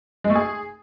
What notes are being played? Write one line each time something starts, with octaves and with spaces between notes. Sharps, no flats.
G#3
A3
G#4